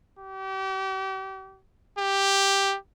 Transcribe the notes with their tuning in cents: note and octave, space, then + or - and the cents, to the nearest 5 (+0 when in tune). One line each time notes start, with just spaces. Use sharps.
G4 -35
G4 +5